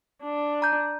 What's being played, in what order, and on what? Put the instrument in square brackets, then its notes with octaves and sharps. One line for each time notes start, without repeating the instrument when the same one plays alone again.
[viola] D4
[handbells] A#5 G6